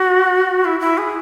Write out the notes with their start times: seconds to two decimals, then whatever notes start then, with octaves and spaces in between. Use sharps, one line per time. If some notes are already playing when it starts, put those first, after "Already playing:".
Already playing: F#4
0.65 E4
0.80 E4
0.98 G#4